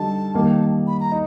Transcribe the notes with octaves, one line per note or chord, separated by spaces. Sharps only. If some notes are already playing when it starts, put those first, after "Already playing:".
Already playing: D3 G3 D#4 A5
D#3 G3 A#3
B5
A#5
D#4